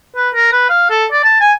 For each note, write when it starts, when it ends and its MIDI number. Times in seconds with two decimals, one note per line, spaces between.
0.16 0.29 71
0.35 0.49 70
0.52 0.69 71
0.70 0.88 77
0.90 1.05 69
1.12 1.24 74
1.24 1.40 81
1.41 1.52 80